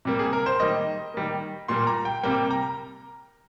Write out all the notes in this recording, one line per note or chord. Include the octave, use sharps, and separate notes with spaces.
C3 G3 A#3
G#4
A#4
C5
D#3 G3 A#3 D#5
D#3 G3 A#3
A#2 G3 A#3 C6
A#5
G5
C3 G3 A#3 G5
A#5